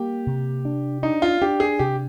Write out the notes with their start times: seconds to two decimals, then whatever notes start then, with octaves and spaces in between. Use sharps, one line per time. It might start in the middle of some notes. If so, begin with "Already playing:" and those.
Already playing: G3 A#3 G4
0.27 C3
0.65 D4
1.03 D4 D#4
1.22 F4
1.42 D4 G4
1.60 G#4
1.79 C3 G4